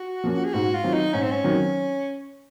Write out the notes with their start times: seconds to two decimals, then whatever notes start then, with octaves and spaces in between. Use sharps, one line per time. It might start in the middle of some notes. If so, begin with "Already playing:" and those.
Already playing: F#4
0.24 F3 A#3 C#4
0.45 G#4
0.54 G#2 F#4
0.74 F4
0.84 D#3 F#3 C4
0.94 D#4
1.14 G#2 C#4
1.22 C4
1.31 C#4
1.44 D#3 F#3 C4